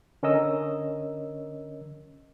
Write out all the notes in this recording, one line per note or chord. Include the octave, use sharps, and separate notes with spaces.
D3 C#4 A#4 C#5 D#5 E6